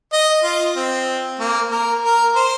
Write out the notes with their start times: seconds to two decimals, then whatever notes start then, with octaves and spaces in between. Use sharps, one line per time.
0.13 D#5
0.44 F4
0.76 C4
1.39 A#3
1.71 A#4
2.05 A#4
2.35 C5